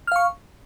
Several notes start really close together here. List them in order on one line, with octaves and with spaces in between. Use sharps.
F6 F5 C#6